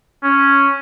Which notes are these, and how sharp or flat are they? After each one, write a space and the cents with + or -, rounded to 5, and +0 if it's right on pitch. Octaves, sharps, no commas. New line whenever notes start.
C#4 +0